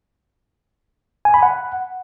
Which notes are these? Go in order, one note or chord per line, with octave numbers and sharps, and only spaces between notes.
G#5
B5
F#5